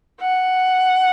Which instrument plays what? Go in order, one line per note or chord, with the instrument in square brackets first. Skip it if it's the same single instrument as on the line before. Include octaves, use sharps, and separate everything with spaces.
[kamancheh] F#5